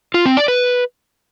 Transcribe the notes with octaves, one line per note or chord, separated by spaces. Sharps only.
F4
C4
D5
B4